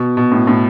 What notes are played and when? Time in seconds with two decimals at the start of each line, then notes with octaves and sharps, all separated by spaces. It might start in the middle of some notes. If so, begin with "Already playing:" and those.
Already playing: B2
0.17 B2
0.32 A2
0.47 A2